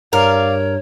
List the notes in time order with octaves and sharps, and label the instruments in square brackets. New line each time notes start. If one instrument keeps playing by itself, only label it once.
[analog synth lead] G2 [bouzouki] A#4 [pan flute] C#5 [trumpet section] D5 F5